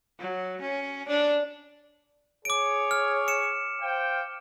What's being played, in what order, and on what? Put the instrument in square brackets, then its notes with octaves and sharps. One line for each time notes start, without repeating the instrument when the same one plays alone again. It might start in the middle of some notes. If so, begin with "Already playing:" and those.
[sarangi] F#3
C#4
D4
[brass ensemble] G#4 C#5 [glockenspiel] D6 D7
[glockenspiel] F6
C#7 E7
[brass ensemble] C5 F5 G5